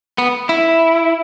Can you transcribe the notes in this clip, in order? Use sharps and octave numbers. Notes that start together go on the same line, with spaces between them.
B3
E4